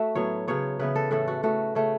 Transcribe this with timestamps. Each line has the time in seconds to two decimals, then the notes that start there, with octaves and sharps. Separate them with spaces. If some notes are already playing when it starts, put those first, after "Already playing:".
Already playing: A3 F#4 E5
0.15 A2 F#3 B3 C#5
0.48 C#3 F#3 B3 C#5
0.79 C#3 E3 B3 B4
0.96 A4
1.11 A2 E3 A3 A4
1.28 F#4
1.43 A2 A3 F#4
1.75 C#3 A3